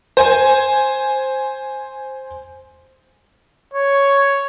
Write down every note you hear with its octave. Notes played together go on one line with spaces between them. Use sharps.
C5 G#5
C#5